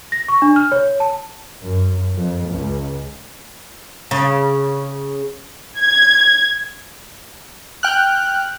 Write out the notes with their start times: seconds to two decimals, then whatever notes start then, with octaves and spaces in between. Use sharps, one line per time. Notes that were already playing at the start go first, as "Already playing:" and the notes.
0.12 A#6
0.28 C#6
0.42 D4
0.56 F6
0.72 C#5
1.00 A5
1.62 F#2
2.16 F2
2.49 C#2
4.11 C#3
5.79 G#6
7.83 G5 F6 F#6